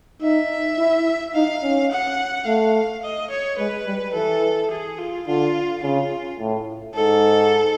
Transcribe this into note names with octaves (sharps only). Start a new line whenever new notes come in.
D#4 E5
E4
D#4 F5
C#4
F#5
A3 F5
D#5
C#5
G#3 B4
G3
E3 A4
G#4
F4
D3 F4
C#3 F4
A2
G#2 A4